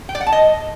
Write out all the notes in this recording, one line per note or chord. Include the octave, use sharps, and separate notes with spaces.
G5
D5
F#5
A5
D#5